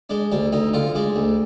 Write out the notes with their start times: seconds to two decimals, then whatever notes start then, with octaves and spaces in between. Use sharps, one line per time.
0.10 G#3 D4
0.32 D2 D4
0.52 D2 D#4
0.74 D3 F4
0.95 G#3 D4
1.16 D2